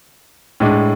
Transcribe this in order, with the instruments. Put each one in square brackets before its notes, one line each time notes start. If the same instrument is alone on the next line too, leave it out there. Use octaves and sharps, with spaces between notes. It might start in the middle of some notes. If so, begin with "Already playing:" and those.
[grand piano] A2 G#3 D4